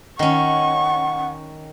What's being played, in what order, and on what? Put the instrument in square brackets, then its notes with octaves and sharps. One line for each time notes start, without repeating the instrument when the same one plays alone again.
[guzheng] D#3 C#4 [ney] F#5 [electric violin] C#6